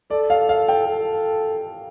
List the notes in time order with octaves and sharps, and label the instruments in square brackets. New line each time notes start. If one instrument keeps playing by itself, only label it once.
[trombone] A4 [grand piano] D5
[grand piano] F5
F5
G5
[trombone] A4